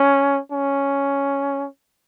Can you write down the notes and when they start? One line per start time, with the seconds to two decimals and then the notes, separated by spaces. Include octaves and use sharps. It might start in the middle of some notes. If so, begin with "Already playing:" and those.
Already playing: C#4
0.52 C#4